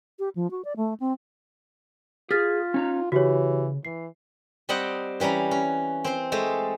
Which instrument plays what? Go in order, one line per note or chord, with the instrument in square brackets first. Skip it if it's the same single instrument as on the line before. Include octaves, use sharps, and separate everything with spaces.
[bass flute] G4
F3
F#4
D5
A3
C4
[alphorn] F4 [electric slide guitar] G#4 [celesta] F6 A6 B6
[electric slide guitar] C#4 D#4 A#5
[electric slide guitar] C#3 [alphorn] E3 [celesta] F#4 G4 C#5
[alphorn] E3 [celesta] C7
[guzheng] G3 C4 D#5 F#5 G5
E3 G3 C#4 F#5 A#5
C#4
C4 C5 C6
G#3 A3 A4 C5